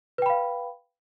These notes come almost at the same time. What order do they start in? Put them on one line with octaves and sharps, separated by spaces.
B4 G5 B5 F5